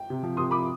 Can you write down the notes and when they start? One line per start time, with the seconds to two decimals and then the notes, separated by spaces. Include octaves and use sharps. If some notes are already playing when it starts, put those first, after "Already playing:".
Already playing: G5
0.10 C3
0.23 F3
0.37 C3 C6 D#6
0.51 F3 B5 D6